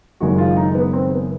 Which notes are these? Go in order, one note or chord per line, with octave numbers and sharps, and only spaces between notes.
F#1 F#2 D#3 G#3 F#4
F4
D#4
B3
C4
B3